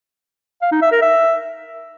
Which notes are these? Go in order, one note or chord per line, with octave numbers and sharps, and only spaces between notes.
F5
D#4
E5
A#4
E5